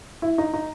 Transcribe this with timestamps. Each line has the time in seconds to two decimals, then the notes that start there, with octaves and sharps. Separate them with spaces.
0.22 E4
0.38 D#4
0.54 D#4